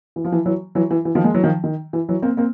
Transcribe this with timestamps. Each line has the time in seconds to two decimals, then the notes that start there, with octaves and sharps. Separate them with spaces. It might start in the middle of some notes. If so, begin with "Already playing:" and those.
0.16 E3
0.25 F3
0.32 E3
0.45 E3 F#3
0.75 E3 F#3
0.91 E3
1.05 E3
1.15 D#3 F3
1.24 G#3 A#3
1.34 E3 F#3
1.44 D#3 F3
1.64 D#3
1.93 E3
2.09 E3 F#3
2.22 A#3 C4
2.37 A#3 C4